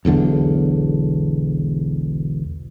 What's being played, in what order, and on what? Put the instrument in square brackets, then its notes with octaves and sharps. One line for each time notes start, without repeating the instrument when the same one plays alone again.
[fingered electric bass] E1 B1 E2 D3